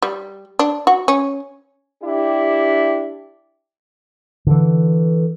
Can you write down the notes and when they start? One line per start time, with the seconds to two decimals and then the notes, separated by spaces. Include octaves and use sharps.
0.02 G3
0.59 D4
0.87 F#4
1.08 C#4
2.03 D4 E4 G4
4.47 D3 E3